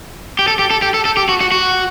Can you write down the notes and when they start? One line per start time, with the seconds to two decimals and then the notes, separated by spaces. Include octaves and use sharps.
0.39 G4
0.48 A4
0.59 G4
0.71 A4
0.82 G4
0.94 A4
1.05 A4
1.17 G4
1.29 F#4
1.41 F#4
1.52 F#4